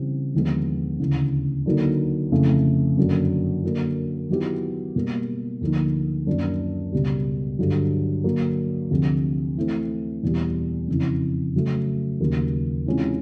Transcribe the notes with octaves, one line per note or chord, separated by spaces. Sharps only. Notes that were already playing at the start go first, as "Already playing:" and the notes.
Already playing: C#3 E3 G3 C4
D#2 D3 F3 G#3 B3
D2 C#3 E3
D3 F#3 A#3 D#4
F2 C#3 E3 A3
F#2 D3 F#3 A#3 D4
D3 F#3 A#3
D#3 F#3 B3 E4 G4
B2 G3 A#3
D2 D3 F3 A#3 D#4
F#2 D#3 F#3 A#3 D4
C#2 B2 G3
G2 D3 F#3
D3 F#3 A#3
D2 C3 F3
E3 A3 C4
E2 B2 G3
F2 C#3 E3
C#3 F#3 A3
D#2 C#3 F#3 A#3
C3 E3 G#3 C#4 F4